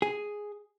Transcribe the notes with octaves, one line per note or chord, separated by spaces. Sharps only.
G#4